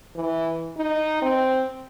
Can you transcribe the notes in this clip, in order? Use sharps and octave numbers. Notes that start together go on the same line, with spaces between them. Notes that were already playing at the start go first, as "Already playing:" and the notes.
E3
D#4
C4